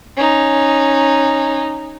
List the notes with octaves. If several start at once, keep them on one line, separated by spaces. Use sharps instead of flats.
C#4 D#4